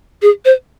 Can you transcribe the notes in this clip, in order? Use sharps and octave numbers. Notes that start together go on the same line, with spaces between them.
G#4
C5